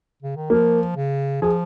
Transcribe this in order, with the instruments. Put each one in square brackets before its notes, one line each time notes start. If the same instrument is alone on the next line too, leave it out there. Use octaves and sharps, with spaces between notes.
[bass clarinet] C#3
D#3
[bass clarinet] F3 [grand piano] A#3
[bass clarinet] C#3
[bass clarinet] F3 [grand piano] G#4